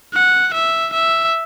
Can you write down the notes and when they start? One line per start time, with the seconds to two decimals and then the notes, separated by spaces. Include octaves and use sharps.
0.14 F#5
0.54 E5
0.93 E5